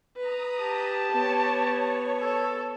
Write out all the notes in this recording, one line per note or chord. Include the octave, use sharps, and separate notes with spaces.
B4 A#5 D#6
G4 A5
B3 C#5
A4